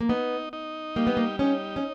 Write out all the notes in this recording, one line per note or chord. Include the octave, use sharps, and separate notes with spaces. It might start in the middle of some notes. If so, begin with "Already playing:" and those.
A#3
B3 D#4
D#4
G3 A#3
B3
A#3
C#4 D#4
C#4